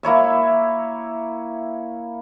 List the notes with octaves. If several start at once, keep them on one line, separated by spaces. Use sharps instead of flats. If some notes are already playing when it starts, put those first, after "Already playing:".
A#3 E4 C#5 E5